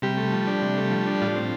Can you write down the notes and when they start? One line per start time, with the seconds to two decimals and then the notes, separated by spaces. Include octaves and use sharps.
0.02 C3 G3 G4
0.17 A3
0.32 F3
0.47 D4
0.62 C3
0.77 A3
0.91 F3
1.06 D4
1.21 A2 F4
1.36 C4